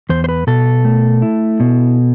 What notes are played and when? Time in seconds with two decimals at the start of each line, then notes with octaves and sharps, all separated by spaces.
0.09 E2 C5
0.24 C5
0.29 B4
0.47 B2 A4
0.85 A3
1.22 E4
1.60 B2